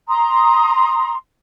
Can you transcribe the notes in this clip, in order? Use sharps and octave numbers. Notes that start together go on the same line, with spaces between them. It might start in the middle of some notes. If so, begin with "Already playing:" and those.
A#5 C6 D#6